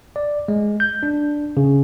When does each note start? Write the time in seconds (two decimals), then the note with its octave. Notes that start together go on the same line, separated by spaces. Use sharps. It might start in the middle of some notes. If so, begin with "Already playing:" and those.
0.16 D5
0.48 G#3
0.80 G6
1.03 D4
1.57 C#3